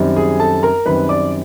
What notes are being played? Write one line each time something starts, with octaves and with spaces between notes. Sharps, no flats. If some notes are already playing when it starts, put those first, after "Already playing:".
Already playing: F#2 D#3 G3 C4
G#4 G#5
A4 A5
A#4 A#5
F#2 D#3 G3 C4 B4 B5
D5 D6